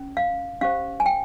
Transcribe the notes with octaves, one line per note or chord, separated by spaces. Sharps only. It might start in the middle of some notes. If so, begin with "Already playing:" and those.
Already playing: C#4
F5
C#4 G4 C5 F5
G#5
G5